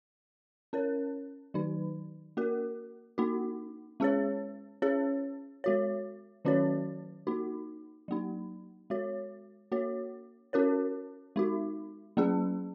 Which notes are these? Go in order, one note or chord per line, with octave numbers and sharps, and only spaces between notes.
C#4 A#4 C#5
D#3 F#3 D#4
A#3 F#4 A#4
A#3 D#4 F#4
G#3 C#4 G#4 C#5
C#4 G#4 C#5
G#3 F#4 C#5
D#3 F#3 C#4 F#4 C#5
A#3 D#4 F#4
F#3 A#3 D#4
G#3 F#4 C#5
A#3 F#4 C#5
C#4 F#4 A#4 C#5
G#3 D#4 F#4
F#3 A#3 C#4 G#4